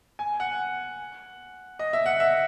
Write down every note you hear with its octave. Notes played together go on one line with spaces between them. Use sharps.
G#5
F#5
D#5
E5
F#5
E5